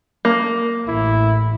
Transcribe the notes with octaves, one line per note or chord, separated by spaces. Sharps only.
A#3
A1 A2 E4